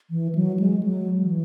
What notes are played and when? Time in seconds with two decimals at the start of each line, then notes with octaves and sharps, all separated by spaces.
0.10 E3
0.35 F#3
0.60 G#3
0.83 F#3
1.20 E3